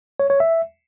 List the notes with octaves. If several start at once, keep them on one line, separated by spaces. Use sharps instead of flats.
C#5
C#5
E5